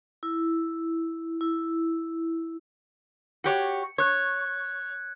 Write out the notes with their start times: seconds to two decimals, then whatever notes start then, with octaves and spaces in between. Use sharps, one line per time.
0.23 E4
1.41 E4
3.44 F#4 G4 C#5 C#7
3.98 C#5 F#6 G#6